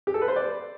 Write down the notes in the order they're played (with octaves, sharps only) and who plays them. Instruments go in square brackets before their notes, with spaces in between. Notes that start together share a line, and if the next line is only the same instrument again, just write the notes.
[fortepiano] G4
A4
B4
C5
D5